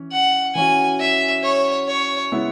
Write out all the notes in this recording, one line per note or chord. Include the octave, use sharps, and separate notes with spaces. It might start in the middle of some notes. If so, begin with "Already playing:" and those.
Already playing: E3 C#4
F#5
E3 C#4 F#4 G#5
E5
C#5
C#5
C#3 G#3 B3 E4